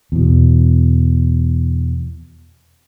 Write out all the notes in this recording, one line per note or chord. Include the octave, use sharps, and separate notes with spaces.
E2 B2